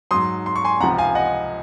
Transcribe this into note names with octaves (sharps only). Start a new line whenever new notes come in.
G#2 F#3 C6 D#6
C6
C#6
G#5 C6
C#2 C3 F3 F#5 A#5
F5 G#5
D#5 F#5